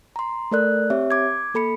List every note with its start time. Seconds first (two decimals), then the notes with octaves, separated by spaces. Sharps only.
0.16 A#5 C6
0.51 A3 A4 A#4 D5 F#6
0.90 C4 G4 C#5 E5
1.11 D6 G#6
1.54 A#3 A4 B5 C#7